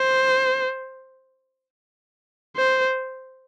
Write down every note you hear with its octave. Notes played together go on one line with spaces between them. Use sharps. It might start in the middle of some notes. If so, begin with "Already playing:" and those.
Already playing: C5
C5